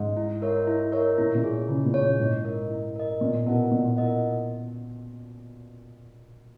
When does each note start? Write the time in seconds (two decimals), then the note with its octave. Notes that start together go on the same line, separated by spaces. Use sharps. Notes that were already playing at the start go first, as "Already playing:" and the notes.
Already playing: G#2
0.17 E4
0.42 A#4 C#5 E5
0.67 E4
0.92 A#4 C#5 E5
1.18 A#2 E4
1.35 A#2
1.43 G#4 C#5
1.68 C#3 E4
1.86 A#2
1.94 G#4 C#5
2.02 A#2
2.19 G#2 E4
2.45 A#4 D#5
2.70 E4
2.96 A#4 D#5
3.21 A#2 B3
3.46 B2 E4 A#4 D#5 F#5
3.72 A#2 B3
3.96 E4 A#4 D#5 F#5